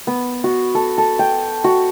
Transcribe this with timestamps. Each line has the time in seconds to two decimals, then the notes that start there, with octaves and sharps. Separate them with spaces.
0.07 B3
0.44 F#4
0.75 A4
0.98 A4
1.19 G5
1.64 F#4